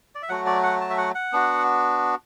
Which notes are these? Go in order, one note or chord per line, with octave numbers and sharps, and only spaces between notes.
D5
E5
F#3 A3 F#4 F#5
D5
F#5
A5
E5
F#5
F#5
B3 D4 F#4